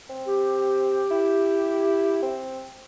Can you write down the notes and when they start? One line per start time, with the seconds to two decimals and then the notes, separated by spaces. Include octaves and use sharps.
0.10 C4
0.27 G4
1.11 E4
2.22 C4